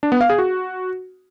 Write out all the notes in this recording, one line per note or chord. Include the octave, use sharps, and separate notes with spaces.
D4
B3
F5
G#4
F#4